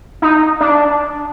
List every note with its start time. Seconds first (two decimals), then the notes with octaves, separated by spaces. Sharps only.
0.22 D#4
0.61 D4